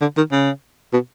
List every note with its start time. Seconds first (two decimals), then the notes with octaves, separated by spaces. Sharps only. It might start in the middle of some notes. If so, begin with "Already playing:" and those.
0.01 D3
0.17 D#3
0.32 C#3
0.93 B2